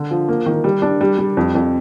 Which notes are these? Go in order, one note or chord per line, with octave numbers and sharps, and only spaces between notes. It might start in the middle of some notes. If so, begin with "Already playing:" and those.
Already playing: D3
F3
A#3
D#3
G3
D4
G3
G3
F2
F2